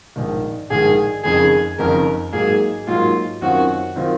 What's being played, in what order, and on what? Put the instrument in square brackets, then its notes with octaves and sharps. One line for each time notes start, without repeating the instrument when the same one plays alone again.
[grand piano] A#1 G#2 D#3
[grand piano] A#1 G#2 D#3 [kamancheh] G#4
[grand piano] F#1 F2 D#3 [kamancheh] G#4
[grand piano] F#1 F2 D#3 [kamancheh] A#4
[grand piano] G#2 F#3 A#3 [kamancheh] G#4
[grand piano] G#2 F#3 A#3 [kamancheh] F4
[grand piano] F#2 D#3 F#3 C4 F4 [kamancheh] F#4
[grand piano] D#3 F#3 C4 F4